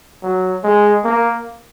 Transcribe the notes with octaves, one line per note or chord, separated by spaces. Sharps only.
F#3
G#3
A#3